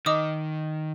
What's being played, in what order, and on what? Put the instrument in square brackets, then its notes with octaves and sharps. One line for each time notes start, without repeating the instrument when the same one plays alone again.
[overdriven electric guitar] D#3 [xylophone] D#5 D6 D#6